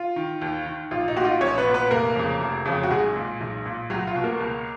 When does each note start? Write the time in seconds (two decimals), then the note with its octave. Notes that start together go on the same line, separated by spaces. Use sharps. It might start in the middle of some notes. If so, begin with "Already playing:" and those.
Already playing: F4
0.16 D#3
0.41 D#2
0.66 D#3
0.91 A#1 F4
1.08 D#4
1.16 A#2 F#4
1.25 F4
1.41 A#1 C#4 C#5
1.58 B3 B4
1.66 A#2
1.74 B3 B4
1.91 F1 A#3 A#4
2.16 F2 C#3
2.41 F1
2.66 F2 C#3
2.83 F#4
2.91 B1 G#3 G#4
3.16 A#2
3.41 B1
3.66 A#2
3.90 C#2 F#3 F#4
4.07 F4
4.16 B2
4.24 A#3 A#4
4.40 C#2